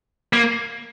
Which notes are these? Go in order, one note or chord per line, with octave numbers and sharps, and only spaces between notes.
A#3